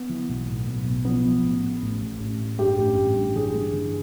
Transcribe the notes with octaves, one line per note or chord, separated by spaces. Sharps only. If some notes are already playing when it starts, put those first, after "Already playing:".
Already playing: B3
E3
B1
A2
B1
B1
F3 B3
F3
A1
A2
A1
A2
A1
A2
G2 G4
A1
A1
G2
E3 G#4
G2
E3